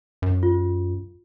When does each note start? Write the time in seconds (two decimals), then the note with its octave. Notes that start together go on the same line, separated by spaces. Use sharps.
0.22 F#2
0.43 F4